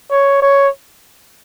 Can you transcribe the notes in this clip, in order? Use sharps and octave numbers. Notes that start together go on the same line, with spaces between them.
C#5
C#5